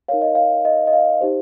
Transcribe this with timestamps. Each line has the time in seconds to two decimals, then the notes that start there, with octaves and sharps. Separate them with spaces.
0.08 D#4 A#4 C#5 F5
0.22 D#5
0.35 F5
0.65 D#5
0.87 D#5
0.93 F5
1.21 D#4 G4 C5